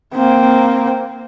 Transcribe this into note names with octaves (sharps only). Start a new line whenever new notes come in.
A#3 C4